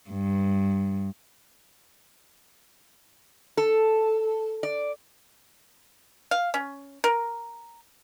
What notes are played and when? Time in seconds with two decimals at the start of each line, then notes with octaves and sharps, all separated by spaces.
0.10 G2
3.57 A4
4.63 D5
6.31 F5
6.54 C#4
7.04 A#4